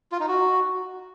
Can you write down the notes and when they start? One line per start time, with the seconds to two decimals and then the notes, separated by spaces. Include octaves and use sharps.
0.12 F4
0.20 D#4
0.28 F#4